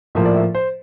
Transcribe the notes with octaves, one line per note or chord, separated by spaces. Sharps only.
A2 F3 A#3 E5
D5
E5
C5